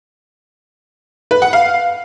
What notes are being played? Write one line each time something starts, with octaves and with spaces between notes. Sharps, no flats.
B4
F#5
F5